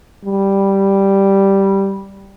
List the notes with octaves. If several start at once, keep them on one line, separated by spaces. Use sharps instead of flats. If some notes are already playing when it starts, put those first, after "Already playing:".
G3